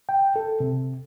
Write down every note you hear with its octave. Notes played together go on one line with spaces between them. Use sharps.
G5
A4
C3